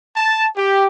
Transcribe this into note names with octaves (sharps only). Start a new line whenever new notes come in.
A5
G4